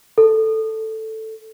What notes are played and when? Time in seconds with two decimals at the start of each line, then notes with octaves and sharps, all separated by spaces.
0.18 A4